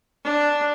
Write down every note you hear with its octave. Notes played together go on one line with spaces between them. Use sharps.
D4